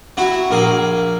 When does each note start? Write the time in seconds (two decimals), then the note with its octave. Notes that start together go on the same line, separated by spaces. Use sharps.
0.17 F#3 E4 F#4
0.51 A#1 A#3 G#4